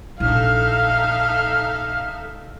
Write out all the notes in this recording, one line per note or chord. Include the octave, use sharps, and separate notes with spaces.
A#1 D#4 E4 A4 E5 F5 F6